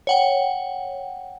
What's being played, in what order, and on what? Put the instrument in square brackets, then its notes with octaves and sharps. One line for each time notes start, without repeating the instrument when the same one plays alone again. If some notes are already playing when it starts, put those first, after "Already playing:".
[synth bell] C#5 F#5 G5